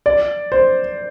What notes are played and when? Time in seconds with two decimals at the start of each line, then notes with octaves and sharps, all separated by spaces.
0.06 D5
0.52 C5